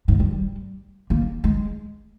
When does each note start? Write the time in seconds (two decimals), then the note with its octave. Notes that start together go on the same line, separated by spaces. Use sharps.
0.08 G#2
0.20 G3
0.31 G3
1.10 A#3
1.44 G#3